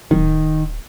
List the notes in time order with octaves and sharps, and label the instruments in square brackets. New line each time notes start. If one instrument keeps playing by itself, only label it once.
[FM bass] D1 [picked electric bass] D#3